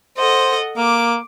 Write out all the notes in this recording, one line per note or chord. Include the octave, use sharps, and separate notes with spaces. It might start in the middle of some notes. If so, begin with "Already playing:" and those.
A4 C5 D#5 F#5
A#3 D6